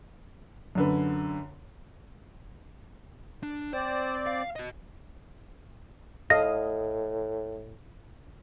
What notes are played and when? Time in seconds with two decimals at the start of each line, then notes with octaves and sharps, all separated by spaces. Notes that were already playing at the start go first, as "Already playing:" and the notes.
0.75 F#2 D3 B4
3.43 D4
3.73 C4 C5 D5
4.26 F5
4.56 F#4 D#5
6.30 A2 A4 D#5 F5 A#6